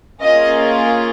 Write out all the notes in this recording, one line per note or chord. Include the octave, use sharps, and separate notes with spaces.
A#3 C#4 F4 G#4 D#5